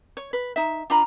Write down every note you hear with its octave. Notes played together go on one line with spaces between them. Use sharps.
C#5
B4
D#4 E5
D4 F4 A#5 B5